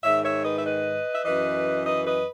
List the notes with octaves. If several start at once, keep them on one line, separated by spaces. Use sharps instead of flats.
G#2 D#3 C#5 E5
C#5 E5
B4 D#5
E5
B4 D#5
E5
F#2 E3 B4 D#5
B4 D#5
B4 D#5